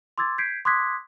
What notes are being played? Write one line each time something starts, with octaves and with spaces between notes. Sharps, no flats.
C6 D6 E6 G#6 A6
G6 G#6 B6 C7 D7
C6 D6 D#6 F#6 G#6 B6